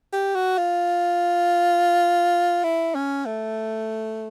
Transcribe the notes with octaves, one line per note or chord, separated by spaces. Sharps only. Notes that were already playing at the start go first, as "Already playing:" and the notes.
G4
F#4
F4
E4
C#4
A3